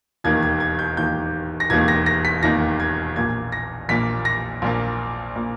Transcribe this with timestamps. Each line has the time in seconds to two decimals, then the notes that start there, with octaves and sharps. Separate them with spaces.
0.24 E1 D#2 D#3 A#3 G#6
0.42 G#6
0.60 G#6
0.79 G6
0.97 E1 D#2 D#3 A#3 G6
1.60 A#6
1.70 E1 D#2 D#3 A#3 G#6
1.88 A#6
2.06 A#6
2.25 B6
2.43 E1 D#2 D#3 A#3 A#6
2.80 G#6
3.16 A#1 A#2 A#3 G#6
3.52 A#6
3.89 A#1 A#2 A#3 B6
4.25 A#6
4.62 A#1 A#2 A#3
5.35 A#2 A#3